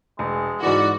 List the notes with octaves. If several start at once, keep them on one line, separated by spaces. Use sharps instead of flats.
E1 G#3
G#2 E3 F#4 D5